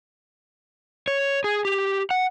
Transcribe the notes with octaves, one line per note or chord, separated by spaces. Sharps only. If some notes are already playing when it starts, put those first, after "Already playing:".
C#5
G#4
G4
F#5